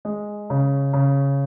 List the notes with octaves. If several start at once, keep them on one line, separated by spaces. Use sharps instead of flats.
G#3
C#3
C#3